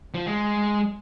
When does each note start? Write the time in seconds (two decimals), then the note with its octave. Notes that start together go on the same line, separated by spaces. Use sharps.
0.14 F3
0.26 G#3